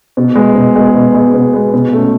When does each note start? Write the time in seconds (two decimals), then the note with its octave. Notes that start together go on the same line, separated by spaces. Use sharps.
0.17 B2
0.36 G#3 B3
0.56 B2
0.76 G#3 B3
0.95 B2
1.14 G#3
1.19 B3
1.34 B2
1.53 G#3 B3
1.73 B2
1.93 A3 C#4